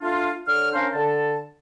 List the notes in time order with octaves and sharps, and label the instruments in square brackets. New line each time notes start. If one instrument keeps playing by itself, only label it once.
[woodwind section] A3 D4 F4
D3 C#5 F6
C#4 D4 A#4 C5 F5
D3 A5